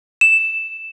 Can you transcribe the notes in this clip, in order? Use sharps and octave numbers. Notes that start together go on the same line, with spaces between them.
E7